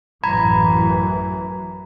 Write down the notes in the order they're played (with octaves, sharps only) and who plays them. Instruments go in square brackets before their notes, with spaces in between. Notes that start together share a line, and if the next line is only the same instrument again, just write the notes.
[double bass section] A1 F#2 E3 [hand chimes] A#5 B5 G#6